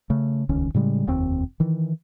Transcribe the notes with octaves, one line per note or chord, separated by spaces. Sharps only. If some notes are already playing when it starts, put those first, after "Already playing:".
C#3 A3
D#1 C#2 D#3 C#4
A2 C#3 G3 G#3
F1 D#2 C4
D#3 E3